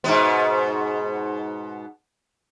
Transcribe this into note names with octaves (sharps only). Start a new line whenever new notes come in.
G#2 B2 B3